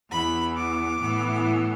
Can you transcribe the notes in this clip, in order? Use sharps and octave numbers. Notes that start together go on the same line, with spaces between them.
E2 E3 B3 B5
D6
A2 E3 B3